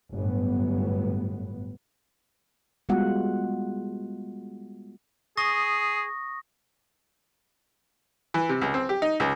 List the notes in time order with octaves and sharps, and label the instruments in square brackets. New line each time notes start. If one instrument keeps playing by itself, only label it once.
[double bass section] G1 F#2 A2 B3
[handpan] G3 G#3 B3 F4 F#4 F#5
[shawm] G#4 [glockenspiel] C#6 D#6 A#6
[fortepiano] E3
C3
C#2
C4
G4
D#4
C#2